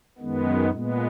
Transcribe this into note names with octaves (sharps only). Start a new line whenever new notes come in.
F#2 D#3 G#3 B3
A#2 G#3 B3